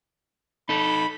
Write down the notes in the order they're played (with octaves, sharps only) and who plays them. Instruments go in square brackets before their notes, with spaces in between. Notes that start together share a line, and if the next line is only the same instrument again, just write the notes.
[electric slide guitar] D#4 A4 [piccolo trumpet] B5